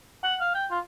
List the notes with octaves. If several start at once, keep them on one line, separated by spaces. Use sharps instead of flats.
F#5
F5
G5
F4